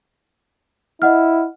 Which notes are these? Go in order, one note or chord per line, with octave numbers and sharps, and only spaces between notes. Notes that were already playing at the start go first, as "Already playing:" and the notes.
E4 D#5 F#5 F6